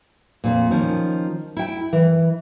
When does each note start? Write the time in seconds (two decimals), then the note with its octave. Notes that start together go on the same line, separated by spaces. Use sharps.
0.44 F2 A#2
0.71 D#3 F3 C#4
1.57 E4 G5
1.93 E3